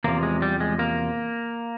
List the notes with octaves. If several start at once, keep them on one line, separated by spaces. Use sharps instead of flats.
E2 C3 F3 A#3
G#3
G3
G#3
A#3